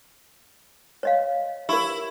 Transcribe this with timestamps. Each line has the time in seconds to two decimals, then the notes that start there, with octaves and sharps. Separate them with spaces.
1.03 C#5 D#5 F5
1.69 E4 G4 A#4